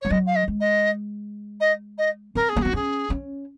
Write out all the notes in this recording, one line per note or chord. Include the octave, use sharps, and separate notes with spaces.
G#3 C#5
F#3 D#5
F5
D#5
G#3
D#5
D#5
D#5
C4 A#4
G#4
A#3
C4 F#4
C#4 G#4
C#4